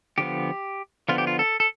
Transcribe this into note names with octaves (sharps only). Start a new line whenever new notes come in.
D3 F3 B3 G4
D3 F3 B3 F4
G4
F4
A4
A4